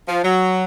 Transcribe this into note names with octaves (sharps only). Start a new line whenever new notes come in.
F3
F#3